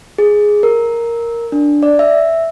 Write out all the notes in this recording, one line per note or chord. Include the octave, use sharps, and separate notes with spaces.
G#4
A#4
D4
D5
E5